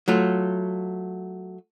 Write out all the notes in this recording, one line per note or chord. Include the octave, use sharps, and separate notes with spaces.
F#3 A3 F4